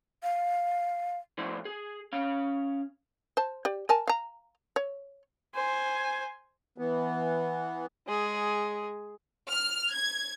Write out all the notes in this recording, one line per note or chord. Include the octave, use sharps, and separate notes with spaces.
F5
A2 F3 E4 C5 D5
G#4
C#4 F5
C5 A5
G4 D5
A#4 G#5 A5
F5 A#5
C#5
C5 G#5
E3 B3
G#3 G#4
F6
G#6